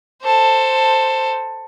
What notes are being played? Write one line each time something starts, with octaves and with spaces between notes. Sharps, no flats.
A4 C5